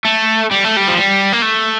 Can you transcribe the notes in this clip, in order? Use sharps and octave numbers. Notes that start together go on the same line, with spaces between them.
A3
G3
A3
G3
F3
G3
A#3
A3